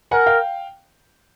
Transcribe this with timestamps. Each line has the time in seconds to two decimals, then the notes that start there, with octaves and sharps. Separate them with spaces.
0.11 A#4 F#5 G#5
0.26 F5 G5